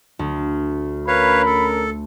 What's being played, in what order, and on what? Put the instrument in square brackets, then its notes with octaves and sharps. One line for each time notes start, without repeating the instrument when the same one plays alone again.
[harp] D2
[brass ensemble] C#4 A#4 [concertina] B4 C#5 F5 [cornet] B5
[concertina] A4